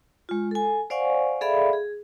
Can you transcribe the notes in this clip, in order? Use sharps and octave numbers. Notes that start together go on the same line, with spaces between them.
G#3 F4
A4 G#5
C5 D5 F5 F#5 G#5 C#6
G#4 A4 D5 E5 F5 B5
G#4